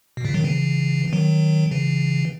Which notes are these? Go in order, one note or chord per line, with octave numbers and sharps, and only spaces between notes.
B2
A#2 C#3
D#3 F#3
C#3 E3
E3
D#3 F#3
C#3 E3